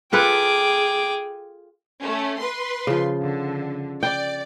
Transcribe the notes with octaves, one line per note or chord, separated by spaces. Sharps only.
F4 G#4 A4 B4 G5 D6
A3 C#4
B4 C6
C#3 F3
D3
D5 G5